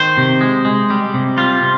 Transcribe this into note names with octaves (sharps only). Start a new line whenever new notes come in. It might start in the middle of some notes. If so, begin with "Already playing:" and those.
Already playing: D#3 C5
C3
G#3
G#3
G3
C3
G3 F4
C3